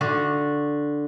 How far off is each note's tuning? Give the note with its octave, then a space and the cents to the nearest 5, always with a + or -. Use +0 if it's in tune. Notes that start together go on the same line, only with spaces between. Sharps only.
D3 +0 F#4 -15